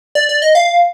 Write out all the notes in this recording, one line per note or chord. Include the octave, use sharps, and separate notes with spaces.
D5
D5
D#5
F5